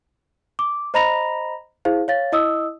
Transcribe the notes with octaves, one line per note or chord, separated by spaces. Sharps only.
D6
C5 D#5 A#5 B5 A#6 F7
E4 G#4 C5 F5
C#5 F5 A6
E4 D#5 D#6 E6